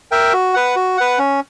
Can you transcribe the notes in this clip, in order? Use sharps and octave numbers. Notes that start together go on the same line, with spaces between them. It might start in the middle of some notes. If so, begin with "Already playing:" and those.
A#4 E5 G5
F#4
B4 F#5
F#4
B4 F#5
C#4